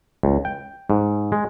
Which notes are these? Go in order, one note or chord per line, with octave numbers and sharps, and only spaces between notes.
C#2
G5
G#2
G#3